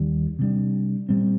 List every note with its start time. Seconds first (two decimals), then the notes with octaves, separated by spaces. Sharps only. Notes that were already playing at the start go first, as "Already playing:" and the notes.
Already playing: D#2 D#3 G3
0.39 C3 G3 D4
1.09 A#2 G3 C4